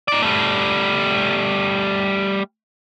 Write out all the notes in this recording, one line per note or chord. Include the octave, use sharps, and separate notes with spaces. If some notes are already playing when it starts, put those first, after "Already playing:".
D#4 D5
G3 A3